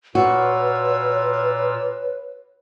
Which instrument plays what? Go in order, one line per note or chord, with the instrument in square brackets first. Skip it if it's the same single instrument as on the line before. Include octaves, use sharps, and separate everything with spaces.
[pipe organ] A#2 F4 E6 [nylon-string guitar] F#4 [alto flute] B4 [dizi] C#5